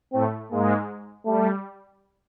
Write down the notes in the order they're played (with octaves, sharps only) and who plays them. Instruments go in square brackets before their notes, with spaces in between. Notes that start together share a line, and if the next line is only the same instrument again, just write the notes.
[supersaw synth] A2 A3 [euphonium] C4
[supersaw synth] G#2 G#3 [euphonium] A#3
[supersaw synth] G3 [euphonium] A3